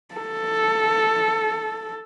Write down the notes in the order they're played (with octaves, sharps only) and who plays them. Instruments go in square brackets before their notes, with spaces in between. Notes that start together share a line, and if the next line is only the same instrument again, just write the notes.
[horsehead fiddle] A4